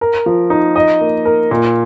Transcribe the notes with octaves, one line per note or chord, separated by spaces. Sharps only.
A#4
F3
D#4
D#5
A#3
A#4
A#2